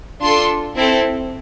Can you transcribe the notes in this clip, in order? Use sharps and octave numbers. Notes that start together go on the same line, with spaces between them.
D4 F4 A4 C6
C4 E4 A4